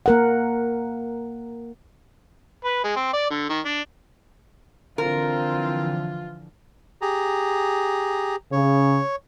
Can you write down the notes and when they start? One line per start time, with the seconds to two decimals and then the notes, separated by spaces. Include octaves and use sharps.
0.06 A#3 A#4 F#5
2.65 B4
2.84 G#3
2.96 C4
3.14 D5
3.31 D3
3.49 D#3
3.65 D4
4.98 D3 E3 F3 C4 F4 A#4
7.02 G4 G#4 A#5
8.52 C#3 C#5